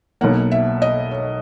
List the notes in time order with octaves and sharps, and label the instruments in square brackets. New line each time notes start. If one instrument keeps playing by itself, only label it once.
[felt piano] B1 B2 F#3 A#3 F#5
E5
D#5
C#5